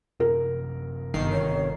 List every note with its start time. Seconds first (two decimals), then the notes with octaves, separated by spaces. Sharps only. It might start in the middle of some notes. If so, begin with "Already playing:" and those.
0.20 F#2 C3 C4 A#4
1.14 G1 D#3 C7
1.32 C3 C4 D4 C#5